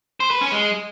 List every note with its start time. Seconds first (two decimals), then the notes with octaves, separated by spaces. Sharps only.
0.20 C5
0.31 B4
0.41 C#4
0.52 G#3